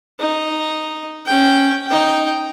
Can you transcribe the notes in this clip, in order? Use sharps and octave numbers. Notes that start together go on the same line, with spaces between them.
D#4
C#4 G5
D#4 G5